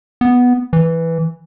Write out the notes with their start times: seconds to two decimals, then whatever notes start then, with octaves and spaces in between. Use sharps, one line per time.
0.21 B3
0.73 E3